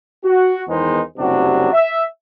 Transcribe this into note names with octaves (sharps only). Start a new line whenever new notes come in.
F#4
E2 D#3 G#3 B3 D#4 C5
F#1 C3 F#3 G3 D4 F#4
E5